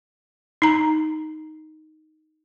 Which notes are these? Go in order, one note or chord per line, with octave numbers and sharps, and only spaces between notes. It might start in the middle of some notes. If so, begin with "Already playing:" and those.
D#4 A#5